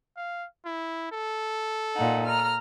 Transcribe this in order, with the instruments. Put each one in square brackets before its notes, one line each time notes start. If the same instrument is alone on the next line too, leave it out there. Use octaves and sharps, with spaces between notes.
[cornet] F5
E4
A4
[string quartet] A#2 D#4 F#5
A#5 F6